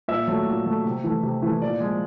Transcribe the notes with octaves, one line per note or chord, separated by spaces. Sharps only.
A#2 E5
F#3 A3
A#2
F#3 A3
C3
E3 A3
C3
E3 A3
A#2 D5
F3 G#3